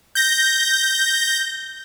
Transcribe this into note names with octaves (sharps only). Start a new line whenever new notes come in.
G6 A#6